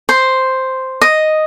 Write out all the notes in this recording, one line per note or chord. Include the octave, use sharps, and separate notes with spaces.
C5
D#5